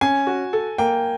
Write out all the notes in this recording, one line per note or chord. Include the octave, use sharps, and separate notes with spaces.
C#4 G#5
F#4
A4
A#3 G5